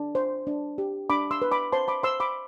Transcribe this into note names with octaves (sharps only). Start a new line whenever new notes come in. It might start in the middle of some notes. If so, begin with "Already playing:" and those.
Already playing: D4
C5
D4
G4
D4 B5 D6
C6 E6
B4
B5 D6
C5 A5 C6
B5 D6
C5 C6 E6
B5 D6